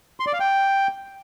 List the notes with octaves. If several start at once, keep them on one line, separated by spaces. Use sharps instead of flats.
C6
D5
F5
G5